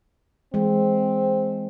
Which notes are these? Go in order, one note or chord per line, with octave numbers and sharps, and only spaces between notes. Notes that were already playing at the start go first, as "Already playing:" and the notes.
E3 G#3 C4